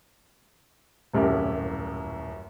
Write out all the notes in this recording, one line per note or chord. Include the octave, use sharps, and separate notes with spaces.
D#1 C2 F#2 A2 G4 A#4